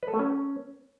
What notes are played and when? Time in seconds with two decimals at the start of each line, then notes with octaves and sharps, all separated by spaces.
0.03 B4
0.08 A4
0.14 A3
0.19 C#4